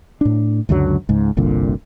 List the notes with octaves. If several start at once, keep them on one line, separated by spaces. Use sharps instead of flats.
A2 D4
C#2 F#2 D3 F#3
C#2 G#2
G1 C2 A#2 D3